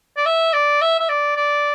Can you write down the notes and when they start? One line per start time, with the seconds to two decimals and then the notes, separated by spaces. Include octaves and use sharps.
0.17 D5
0.26 E5
0.53 D5
0.81 E5
1.00 E5
1.09 D5
1.36 D5